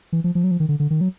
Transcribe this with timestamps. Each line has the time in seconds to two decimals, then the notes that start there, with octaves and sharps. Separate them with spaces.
0.12 E3
0.24 F3
0.35 F3
0.44 F#3
0.51 F3
0.60 D#3
0.69 D3
0.80 D3
0.90 D#3
1.01 F#3